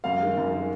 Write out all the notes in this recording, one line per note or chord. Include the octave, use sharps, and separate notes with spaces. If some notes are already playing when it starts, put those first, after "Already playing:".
F#2 F5
D#3 G#3
F#2
D#3 G#3